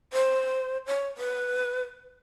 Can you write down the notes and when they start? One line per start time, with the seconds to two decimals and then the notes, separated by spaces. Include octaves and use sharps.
0.13 C5
0.86 C#5
1.17 B4